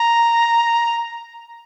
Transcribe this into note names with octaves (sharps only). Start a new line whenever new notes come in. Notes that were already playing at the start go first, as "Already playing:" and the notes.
Already playing: A#5